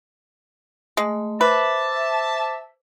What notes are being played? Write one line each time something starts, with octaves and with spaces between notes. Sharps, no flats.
G#3 A3
B4 C5 E5 A5 D6